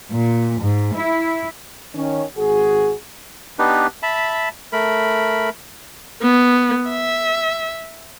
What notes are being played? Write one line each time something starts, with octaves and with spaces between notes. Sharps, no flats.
A#2
G#2
E4
D#3 C#4
G#1 F#4 G#4
B3 D4 D#4 G4 B4
E5 A5 B5
A3 A#4 B5
B3
E5